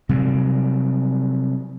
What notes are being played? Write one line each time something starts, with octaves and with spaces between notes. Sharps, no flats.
C3 F#3 G3